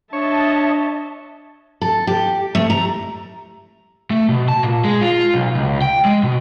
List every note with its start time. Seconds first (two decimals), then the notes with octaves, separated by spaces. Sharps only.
0.13 D4 C#5 D#5 E5 A5
1.82 A4
2.07 G4
2.55 A3
2.70 A#5
4.11 A3
4.29 B2
4.48 A5
4.63 A#2
4.84 G#3
5.01 F4
5.34 B1
5.55 C#2
5.82 G5
6.05 G#3
6.23 B2